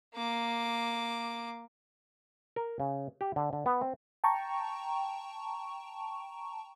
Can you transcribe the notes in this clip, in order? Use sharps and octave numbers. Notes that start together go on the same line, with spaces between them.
A#3 D6
A#4
C#3
G4
D3
D3
B3
C4
G5 A5 A#5 C#6